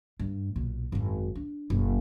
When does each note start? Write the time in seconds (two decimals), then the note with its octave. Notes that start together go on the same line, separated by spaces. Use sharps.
0.19 G2
0.56 B1 A#2
0.92 G#1 F#2
1.35 D4
1.70 F#1 B1